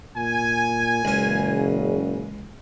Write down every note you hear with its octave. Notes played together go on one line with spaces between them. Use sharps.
A#2 G#5
F#1 C#2 A#2 C#3 E3 C#4